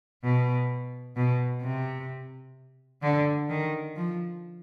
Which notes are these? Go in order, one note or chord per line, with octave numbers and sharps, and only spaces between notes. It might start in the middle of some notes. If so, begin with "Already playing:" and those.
B2
B2
C3
D3
D#3
F3